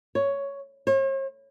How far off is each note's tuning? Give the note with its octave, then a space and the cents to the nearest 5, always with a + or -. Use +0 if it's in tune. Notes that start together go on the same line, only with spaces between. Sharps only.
C#5 +5
C#5 -45